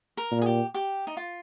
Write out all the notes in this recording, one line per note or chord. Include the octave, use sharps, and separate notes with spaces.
A#4
A#2
G#4
G4
G4
D#4
F4